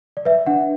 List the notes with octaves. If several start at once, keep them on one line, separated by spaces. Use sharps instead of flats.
D5
B4 E5
D4 F#5